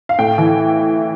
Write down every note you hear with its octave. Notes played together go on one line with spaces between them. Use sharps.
F5
A2 G5
E3